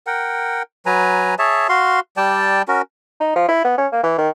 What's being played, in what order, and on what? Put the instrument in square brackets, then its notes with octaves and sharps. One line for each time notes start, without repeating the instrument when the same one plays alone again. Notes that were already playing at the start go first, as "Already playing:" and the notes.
[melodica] A#4 F#5 G5
F#3 B4 G#5 A#5
G#4 C#5 E5 A5
F#4 F5 C6
G3 D5 G5 A5
C#4 F#4 A#4
[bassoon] D#4
F3
E4
B3
C#4
A#3
E3
D#3